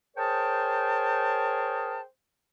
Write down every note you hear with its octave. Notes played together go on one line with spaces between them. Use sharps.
G#4 A#4 C5 C#5 G5 A5